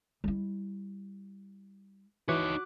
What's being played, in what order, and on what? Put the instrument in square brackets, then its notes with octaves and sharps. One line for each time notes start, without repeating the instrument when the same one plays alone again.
[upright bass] G3 E4
[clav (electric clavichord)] E3 [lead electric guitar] D#4 C#5 [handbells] F#4 D6 F#6